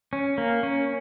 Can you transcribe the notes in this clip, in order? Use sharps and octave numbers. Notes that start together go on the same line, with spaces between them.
C#4
A#3
C#4